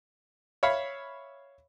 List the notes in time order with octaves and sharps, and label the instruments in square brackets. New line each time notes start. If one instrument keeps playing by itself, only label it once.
[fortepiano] C#5 E5 F5 B5